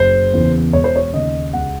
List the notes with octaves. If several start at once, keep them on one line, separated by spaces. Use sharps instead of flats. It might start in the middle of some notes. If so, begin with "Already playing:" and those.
Already playing: F#1 C5
E2 C#3 E3
E1 C#5
C5
C#5
D#2 C#3 D#5
C#2 F#5